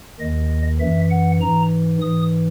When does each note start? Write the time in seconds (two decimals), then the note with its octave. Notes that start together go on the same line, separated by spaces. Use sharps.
0.20 D#2 D#3 D#5
0.80 F#2 E3 E5
1.10 F#5
1.40 G#2 E3 A#5
2.01 G#2 E3 D#6